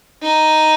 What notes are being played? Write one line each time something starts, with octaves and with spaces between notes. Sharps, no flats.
D#4